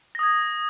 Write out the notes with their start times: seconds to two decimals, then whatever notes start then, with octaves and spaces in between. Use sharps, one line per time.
0.15 A#6
0.19 D#6
0.23 G#6